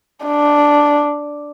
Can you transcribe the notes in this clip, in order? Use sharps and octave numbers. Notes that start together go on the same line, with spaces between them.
D4